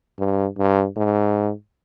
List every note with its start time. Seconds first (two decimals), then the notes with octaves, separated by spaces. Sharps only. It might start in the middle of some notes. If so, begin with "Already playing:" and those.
0.19 G2
0.58 G2
0.97 G#2